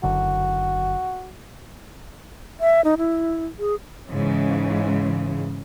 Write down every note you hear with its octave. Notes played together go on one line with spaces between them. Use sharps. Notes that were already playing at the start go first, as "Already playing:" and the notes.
F#1 F#2 D3 F#4
E5
D#4
E4
G#4
G#2 C#3 E3